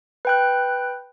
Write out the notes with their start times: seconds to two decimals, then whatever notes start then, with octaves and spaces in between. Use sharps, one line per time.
0.25 B4 G5 F#6